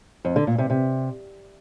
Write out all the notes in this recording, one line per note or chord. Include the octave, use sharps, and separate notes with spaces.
F2
D3
A#2
C3
C3